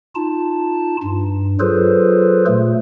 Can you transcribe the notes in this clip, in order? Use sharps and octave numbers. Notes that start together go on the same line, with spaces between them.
D#4 F4 A5
G2
F#3 F4 G#4 A4 B4 C5
A#2 A3